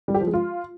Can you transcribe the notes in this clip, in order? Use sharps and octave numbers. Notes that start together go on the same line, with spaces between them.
G3
G4
F3
G#3
F4